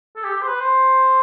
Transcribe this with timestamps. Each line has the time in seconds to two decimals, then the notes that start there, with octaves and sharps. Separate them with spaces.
0.16 A4
0.24 G4
0.36 G4
0.42 C5
0.48 B4
0.60 C5